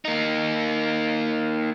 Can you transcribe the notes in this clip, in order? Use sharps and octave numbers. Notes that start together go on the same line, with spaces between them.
A#3 D#4